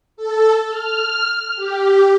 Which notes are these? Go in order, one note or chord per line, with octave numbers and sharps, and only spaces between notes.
A4
F6
G4